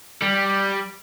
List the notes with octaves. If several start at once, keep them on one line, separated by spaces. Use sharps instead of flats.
G3